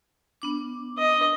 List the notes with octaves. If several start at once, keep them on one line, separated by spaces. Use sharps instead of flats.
B3 D4 D6
D#5